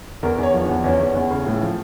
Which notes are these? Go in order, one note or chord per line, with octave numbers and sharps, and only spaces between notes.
E2 A#4
E2
C#5
F3
D4
E2
E2 C#4
E2
E2
C#3
A2
F3